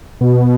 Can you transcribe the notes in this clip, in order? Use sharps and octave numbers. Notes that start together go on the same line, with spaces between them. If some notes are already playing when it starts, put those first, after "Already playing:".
B2